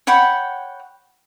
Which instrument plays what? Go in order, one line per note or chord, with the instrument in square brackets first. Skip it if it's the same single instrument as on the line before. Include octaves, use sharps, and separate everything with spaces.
[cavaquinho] C#5 F#5 G5 B5